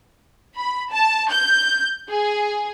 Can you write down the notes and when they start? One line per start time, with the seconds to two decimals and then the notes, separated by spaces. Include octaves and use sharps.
0.56 B5
0.90 A5
1.30 G6
2.10 G#4